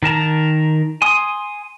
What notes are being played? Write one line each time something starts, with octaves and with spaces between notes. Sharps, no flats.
D#3 A#4 A5 A#5
G#5 C6 D#6